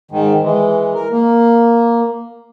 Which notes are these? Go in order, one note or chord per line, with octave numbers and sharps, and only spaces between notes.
G#2 D#3
E3 G#3
A#4
A#3